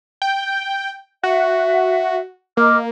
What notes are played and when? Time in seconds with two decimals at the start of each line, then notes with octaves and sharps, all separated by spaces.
0.22 G5
1.23 F#4 E5
2.57 A#3 D#5 D6 F6